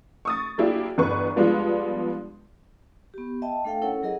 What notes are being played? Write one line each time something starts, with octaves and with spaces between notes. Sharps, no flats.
C#6 D#6 A6
F#3 A#3 D4 E4 G4 G#4
G1 E2 B4 C#6
F3 G3 G#3 B3 D4
B3 G4
D#5 E5 G5 A5
A3 D4 A4 F5 G5
C#4 E4 A4 A#4 C#5 F#5
F#3 G#4 A#4 D#5 F#5